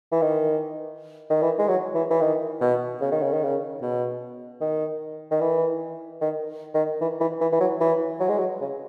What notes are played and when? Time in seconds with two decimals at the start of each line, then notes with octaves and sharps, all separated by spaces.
0.12 E3
0.22 D#3
1.30 D#3
1.42 E3
1.59 G#3
1.68 F#3
1.95 E3
2.10 E3
2.21 D#3
2.61 B2
3.01 C#3
3.12 D#3
3.22 C#3
3.33 D#3
3.44 C#3
3.82 B2
4.61 D#3
5.31 D#3
5.41 E3
6.21 D#3
6.74 D#3
7.01 E3
7.21 E3
7.41 E3
7.52 E3
7.61 F#3
7.81 E3
8.20 F#3
8.29 G#3
8.38 F#3
8.61 C#3